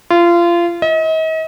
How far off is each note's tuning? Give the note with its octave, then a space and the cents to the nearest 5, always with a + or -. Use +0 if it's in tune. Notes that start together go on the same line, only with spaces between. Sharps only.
F4 -25
D#5 +40